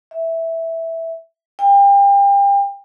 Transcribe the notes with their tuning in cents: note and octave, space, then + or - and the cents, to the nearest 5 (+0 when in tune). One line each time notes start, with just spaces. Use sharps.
E5 -5
G5 +35